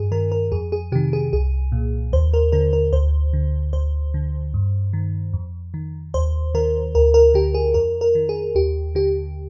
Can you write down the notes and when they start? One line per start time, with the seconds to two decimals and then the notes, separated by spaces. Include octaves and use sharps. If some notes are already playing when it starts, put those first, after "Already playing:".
Already playing: G2 G#4
0.12 D#3 A#4
0.32 A#4
0.52 F2 G#4
0.72 G#4
0.92 C3 D#3 G4
1.13 G#4
1.33 C2 G#4
1.72 A#2
2.13 D#2 C5
2.33 A#4
2.52 D3 A#4
2.73 A#4
2.93 D2 C5
3.33 D3
3.73 D2 C5
4.14 D3
4.54 G2
4.93 D#3
5.33 F2
5.74 D#3
6.14 D#2 C5
6.54 D#3 A#4
6.95 D2 A#4
7.14 A#4
7.34 D3 G4
7.54 G#4
7.74 F2 A#4
8.01 A#4
8.15 D#3
8.29 G#4
8.55 D#2 G4
8.95 D3 G4